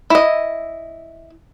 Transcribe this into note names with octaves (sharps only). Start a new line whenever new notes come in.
E4 D#5